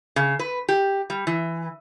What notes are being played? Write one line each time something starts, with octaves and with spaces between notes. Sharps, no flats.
C#3
B4
G4
G3
E3